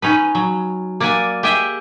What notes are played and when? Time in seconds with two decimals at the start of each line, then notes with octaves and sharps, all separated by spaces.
0.02 C#4 D#4 B4
0.35 F#3
1.00 A#3 D5 E5 F#5 G#5
1.43 G4 G#4 D#5 E5 G#5